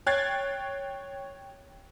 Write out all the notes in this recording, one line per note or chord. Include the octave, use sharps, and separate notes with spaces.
C#5 G5 F#6 G#6 A6 C7